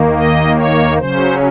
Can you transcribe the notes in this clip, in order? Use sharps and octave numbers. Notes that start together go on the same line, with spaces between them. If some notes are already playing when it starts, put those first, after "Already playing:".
Already playing: D#2 D#3 A#3
D#5
C#5
C#3 F#3 C#4 C5